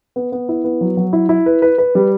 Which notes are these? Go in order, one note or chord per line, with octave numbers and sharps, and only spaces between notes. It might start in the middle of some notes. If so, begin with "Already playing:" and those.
B3
B3
E4
B3
F#3
F#3
E4
E4
B4
B4
B4
G3